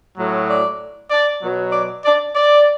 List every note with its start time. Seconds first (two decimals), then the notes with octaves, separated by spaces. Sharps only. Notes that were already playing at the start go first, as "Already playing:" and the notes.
0.17 A2 F#3
0.48 D5
1.11 D5
1.42 B2 F#3
1.73 D5
2.05 D5
2.36 D5